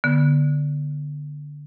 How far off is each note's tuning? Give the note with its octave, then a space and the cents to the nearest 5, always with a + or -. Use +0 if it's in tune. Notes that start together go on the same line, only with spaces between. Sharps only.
D3 +0 B3 -20